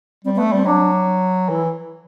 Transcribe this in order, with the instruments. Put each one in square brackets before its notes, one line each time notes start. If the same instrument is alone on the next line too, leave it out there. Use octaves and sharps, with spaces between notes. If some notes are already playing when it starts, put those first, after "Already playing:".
[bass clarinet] G3 [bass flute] C4
[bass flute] B3
[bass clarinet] A3
[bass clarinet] G3 [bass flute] C4
[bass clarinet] F#3 [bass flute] D4
[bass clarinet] E3 [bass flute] E4